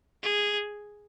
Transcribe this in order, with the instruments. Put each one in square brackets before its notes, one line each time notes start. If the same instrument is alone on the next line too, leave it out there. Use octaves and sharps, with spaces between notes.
[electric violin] G#4